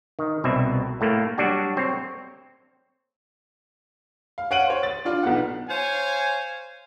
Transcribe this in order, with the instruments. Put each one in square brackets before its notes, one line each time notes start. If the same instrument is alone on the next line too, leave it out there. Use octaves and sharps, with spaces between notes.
[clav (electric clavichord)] D#3
C2 B2 C4 E5
A2 A3 A#3
F#3 G3 D4 F#4
C4 C5 C#5
[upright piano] F5
C#5 F5 F#5 D7 D#7 F#7
C5 C#5
A6
D4 F4 D5
B1 B2 F#5
[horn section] C5 C#5 F5 G#5